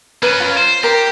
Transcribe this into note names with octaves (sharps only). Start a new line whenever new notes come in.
C#4 A#4 B4
F4
C5
G4 A#4 A#5